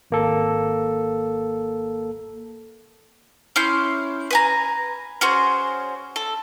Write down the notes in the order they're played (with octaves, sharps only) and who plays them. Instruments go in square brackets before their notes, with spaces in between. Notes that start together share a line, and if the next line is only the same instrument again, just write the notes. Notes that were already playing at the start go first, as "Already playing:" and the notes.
[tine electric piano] G#1 A#3 A4
[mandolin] C#4 E4 C6 G6
B4 G#5 A#5
C#4 F#4 G#4 C5
A4